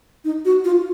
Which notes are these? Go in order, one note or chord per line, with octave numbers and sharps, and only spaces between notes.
D#4
F#4
F4